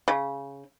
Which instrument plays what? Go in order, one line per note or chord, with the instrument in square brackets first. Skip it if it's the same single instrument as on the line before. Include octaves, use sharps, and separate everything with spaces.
[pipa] C#3